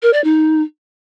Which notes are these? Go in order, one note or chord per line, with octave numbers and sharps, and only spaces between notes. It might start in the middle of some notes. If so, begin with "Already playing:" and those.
A#4
D5
D#4